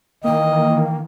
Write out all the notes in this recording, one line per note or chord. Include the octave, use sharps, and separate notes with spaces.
D#3 E3 A#3 D#5 G5